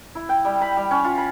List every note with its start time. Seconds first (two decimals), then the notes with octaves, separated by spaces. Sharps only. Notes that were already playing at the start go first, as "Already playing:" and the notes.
0.15 E4
0.29 G5
0.45 G3
0.61 B5
0.77 G3
0.91 C#4
1.04 F4
1.17 B5